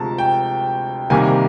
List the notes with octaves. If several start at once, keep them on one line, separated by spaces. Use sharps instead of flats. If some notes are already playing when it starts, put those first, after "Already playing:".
Already playing: D2 C3 F3 G#3 A5 A#5
G5
C2 C3 D#3 G3 A#3 G#5